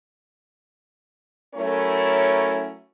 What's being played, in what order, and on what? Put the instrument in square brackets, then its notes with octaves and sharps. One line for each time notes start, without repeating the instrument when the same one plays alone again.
[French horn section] F#3 A3 C#4 E4 A#4 C#5